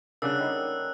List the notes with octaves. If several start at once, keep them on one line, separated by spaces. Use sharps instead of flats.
C#3 G3 C#4 D4 A#4 F#5 E6 F#6
A3 A#3 D#4 E4 G5